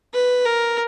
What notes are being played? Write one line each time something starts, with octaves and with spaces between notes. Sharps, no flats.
B4
A#4